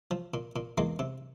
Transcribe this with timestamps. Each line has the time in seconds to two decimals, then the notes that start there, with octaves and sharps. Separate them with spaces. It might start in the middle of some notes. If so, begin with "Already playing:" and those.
0.11 F3
0.34 A#2
0.56 A#2
0.78 E2 G#3 A#3
0.99 C3